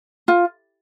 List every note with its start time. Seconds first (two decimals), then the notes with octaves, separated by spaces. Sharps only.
0.28 F4